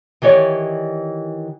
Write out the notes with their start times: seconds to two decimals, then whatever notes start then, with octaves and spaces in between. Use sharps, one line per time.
0.22 D#3 E3 G4 C#5 D5